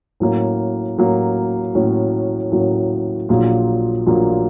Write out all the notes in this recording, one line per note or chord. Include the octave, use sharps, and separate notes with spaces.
A2 F#3 A#3 C#4
A2 F#3 A#3 C#4
A2 F#3 A#3 C#4
A2 F#3 A#3 C#4
A#1 A#2 F#3 A#3 F4
A#1 A#2 F#3 A#3 F4